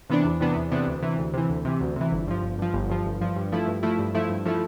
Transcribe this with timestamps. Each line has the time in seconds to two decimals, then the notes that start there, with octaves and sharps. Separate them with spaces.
0.10 C3 E3 B3 D4
0.25 E2
0.41 C3 E3 B3 D4
0.56 E2
0.71 C3 E3 B3 D4
0.87 D2
1.03 C3 E3
1.18 D2
1.34 C3 E3
1.49 D2
1.65 C3 E3
1.81 D2
1.96 C3 E3
2.12 G1
2.27 G2 F3
2.43 G1
2.58 G2 F3
2.74 G1
2.89 G2 F3
3.05 G1
3.21 G2 F3
3.36 G2
3.52 F3 A3 E4
3.67 G2
3.83 F3 A3 E4
3.99 G2
4.15 F3 A3 E4
4.30 G2
4.45 F3 A3 E4